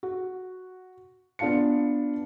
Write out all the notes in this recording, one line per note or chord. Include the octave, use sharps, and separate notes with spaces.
F#4
B3 D4 F4 F5 A5 C#7